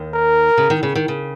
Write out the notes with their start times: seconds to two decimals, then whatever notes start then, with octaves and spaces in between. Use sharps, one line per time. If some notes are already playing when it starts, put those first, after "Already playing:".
Already playing: D#2 D#3
0.14 A#4
0.58 C#3
0.70 D#3
0.83 C#3
0.95 D#3
1.08 C#3